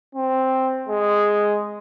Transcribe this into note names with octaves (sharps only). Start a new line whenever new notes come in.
C4
G#3